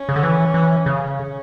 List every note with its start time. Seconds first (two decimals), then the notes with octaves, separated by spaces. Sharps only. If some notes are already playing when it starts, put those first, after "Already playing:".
Already playing: C#4
0.09 C#3
0.16 D3
0.23 E3
0.54 E3
0.86 C#3 C#4